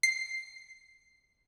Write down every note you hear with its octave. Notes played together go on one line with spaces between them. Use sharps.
C7